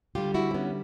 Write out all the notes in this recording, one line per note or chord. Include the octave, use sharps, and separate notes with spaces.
D3 G3 F4 G4
E4 F#4
C4
B3 C#4